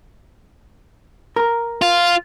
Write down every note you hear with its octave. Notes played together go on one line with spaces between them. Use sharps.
A#4
F4